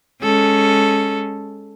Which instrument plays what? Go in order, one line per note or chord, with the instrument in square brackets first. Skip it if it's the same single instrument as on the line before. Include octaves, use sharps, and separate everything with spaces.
[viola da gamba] G#3 C#4 A4